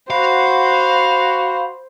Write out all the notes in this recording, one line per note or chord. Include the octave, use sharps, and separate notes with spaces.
F#4 C5 F5 B5